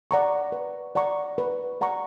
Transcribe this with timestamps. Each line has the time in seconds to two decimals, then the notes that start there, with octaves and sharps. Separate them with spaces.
0.11 D5 F#5 A#5 C#6
0.52 B4
0.95 D5 F#5 A#5 C#6
1.38 B4
1.81 D5 F#5 A#5 C#6